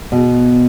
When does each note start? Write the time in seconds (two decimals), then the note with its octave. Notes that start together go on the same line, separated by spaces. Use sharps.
0.12 B2